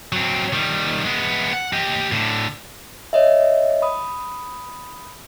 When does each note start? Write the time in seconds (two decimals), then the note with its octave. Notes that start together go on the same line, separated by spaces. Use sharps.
0.12 F#3 C4
0.53 D#3 G3
1.05 G#3 B3
1.53 F#5
1.73 G4 D#5
2.12 A2 D3
3.13 C#5 D#5 E5
3.82 B5 D#6